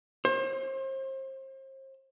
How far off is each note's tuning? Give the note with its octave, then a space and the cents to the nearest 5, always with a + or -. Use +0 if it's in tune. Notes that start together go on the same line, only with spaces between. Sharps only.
C5 +35